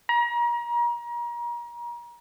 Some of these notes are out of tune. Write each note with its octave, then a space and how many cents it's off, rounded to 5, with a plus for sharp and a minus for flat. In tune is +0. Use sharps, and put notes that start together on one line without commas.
A#5 +35